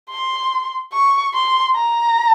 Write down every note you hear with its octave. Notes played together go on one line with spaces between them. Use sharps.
C6
C#6
C6
A#5